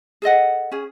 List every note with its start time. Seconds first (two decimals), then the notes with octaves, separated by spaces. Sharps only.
0.22 G#4 A4 D#5 F#5
0.71 C#4 G#4